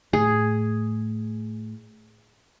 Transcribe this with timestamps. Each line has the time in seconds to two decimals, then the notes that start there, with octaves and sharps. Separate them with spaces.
0.13 A2 G#4